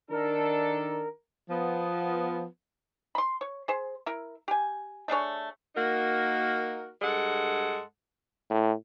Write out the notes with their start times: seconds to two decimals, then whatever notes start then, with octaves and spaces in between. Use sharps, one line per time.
0.11 D#3 D4 A4 A#4
1.50 F3 B3
3.15 B5 C6
3.41 C#5
3.68 G#4 C5
4.06 E4 A#4
4.48 G4 G#5
5.08 A3 D4 G#4 C#5
5.76 A#3 D#4 F#4 A#4
7.02 G2 G#3 A4 F#5
8.50 A2